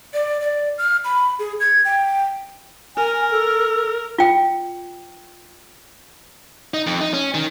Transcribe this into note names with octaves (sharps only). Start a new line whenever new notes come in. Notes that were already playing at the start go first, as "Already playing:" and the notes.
D5
D5
F6
B5
G#4
G#6
G5
A#4 G#5
A4
F4 G5
D#4
F2
D#4
C#4
D#3